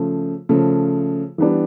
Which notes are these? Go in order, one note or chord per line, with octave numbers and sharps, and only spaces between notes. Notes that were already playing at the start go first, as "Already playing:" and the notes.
Already playing: C#3 F3 A3
C#3 F3 A3
E3 G3 B3 D4